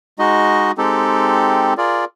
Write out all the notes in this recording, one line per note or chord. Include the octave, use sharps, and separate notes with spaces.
G#3 D#4 F#4 D#5
G#3 C4 D#4 G4 A4
F4 G#4 A#4 D5